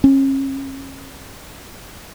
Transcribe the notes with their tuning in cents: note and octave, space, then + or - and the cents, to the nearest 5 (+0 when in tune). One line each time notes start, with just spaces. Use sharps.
C#4 -35